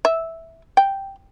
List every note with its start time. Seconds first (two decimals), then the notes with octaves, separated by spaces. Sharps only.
0.05 E5
0.77 G5